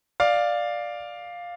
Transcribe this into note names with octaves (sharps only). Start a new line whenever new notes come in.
D5 F5